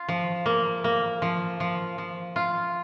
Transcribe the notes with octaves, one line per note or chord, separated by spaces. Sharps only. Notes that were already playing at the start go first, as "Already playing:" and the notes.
Already playing: F4
F3
A#3
A#3
F3
F3
F3
F4